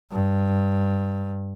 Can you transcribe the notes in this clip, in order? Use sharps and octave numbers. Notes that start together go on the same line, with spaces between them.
G2